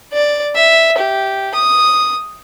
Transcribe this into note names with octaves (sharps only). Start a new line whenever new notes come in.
D5
E5
G4
D#6